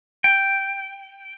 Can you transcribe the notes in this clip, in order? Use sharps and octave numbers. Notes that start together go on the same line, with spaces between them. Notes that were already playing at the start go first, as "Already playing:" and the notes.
G5